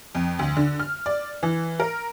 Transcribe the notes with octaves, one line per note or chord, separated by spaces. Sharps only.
F2
D2
D3
F6
D5
E3
A#4